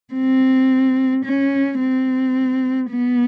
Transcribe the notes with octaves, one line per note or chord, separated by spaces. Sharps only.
C4
C#4
C4
B3